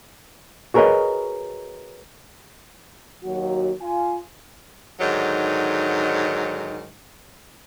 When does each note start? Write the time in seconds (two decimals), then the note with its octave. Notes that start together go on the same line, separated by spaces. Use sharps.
0.74 F#4 G#4 A#4 B4 C#5 D#5
3.24 D#2 F#3 F#4
3.81 F4 G#5
4.99 G#2 D3 D#3 F#3